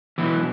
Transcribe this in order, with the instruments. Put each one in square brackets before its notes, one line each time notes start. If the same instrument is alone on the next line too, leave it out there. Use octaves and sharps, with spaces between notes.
[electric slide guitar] B2 E3 F#3 B3 E4